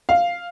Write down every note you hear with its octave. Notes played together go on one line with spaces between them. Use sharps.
F5